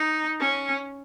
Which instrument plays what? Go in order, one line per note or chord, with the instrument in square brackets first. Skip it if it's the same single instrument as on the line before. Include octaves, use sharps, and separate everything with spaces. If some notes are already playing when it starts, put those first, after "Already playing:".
Already playing: [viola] D#4
C#4